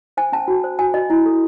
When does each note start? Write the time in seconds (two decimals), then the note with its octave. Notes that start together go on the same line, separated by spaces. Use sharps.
0.17 C5 G#5
0.32 C#4 A5
0.48 F#4
0.64 C5
0.79 F#4 G#5
0.94 F#4 D#5
1.10 E4
1.26 A4